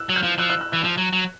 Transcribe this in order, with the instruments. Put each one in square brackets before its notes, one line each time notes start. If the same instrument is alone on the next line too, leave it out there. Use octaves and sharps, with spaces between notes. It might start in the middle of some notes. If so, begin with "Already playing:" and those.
Already playing: [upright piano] E6 F#6
[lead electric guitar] F#3
[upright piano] F6 G6
[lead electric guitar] F3
[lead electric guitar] F3 [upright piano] E6 F#6
[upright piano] E6 F#6
E6 F#6
[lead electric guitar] E3 [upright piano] E6 F#6
[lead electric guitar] F3
F#3
F#3